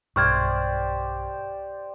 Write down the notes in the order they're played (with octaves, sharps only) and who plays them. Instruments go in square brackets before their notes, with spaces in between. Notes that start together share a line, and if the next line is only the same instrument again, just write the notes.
[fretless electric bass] B1 G2 [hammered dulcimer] G4 C5 D5 [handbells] C#6 F6 G#6